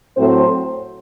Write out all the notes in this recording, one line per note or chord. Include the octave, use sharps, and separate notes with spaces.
A2 F#3 A3 C4 C5